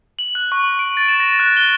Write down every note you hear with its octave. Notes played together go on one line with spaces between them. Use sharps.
F#7
F#6
C#6
D7
A6
E7
A#6
F#6
G7